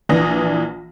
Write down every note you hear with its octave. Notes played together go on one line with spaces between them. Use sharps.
A#1 E3 D4 D#6 A#6